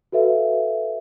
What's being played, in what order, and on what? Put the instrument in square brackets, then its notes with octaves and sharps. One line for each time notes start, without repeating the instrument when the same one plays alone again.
[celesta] F#4 A4 B4 E5 F5